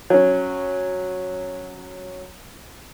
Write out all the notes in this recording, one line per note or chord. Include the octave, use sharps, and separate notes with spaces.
F#3 C#4